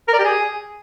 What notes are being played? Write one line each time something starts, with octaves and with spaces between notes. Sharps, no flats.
A#4
D5
G4
G#4